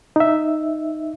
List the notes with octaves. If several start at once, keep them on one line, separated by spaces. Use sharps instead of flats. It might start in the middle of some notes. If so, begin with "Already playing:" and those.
D#4 E5